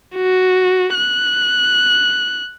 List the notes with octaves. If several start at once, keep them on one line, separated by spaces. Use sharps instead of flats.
F#4
F#6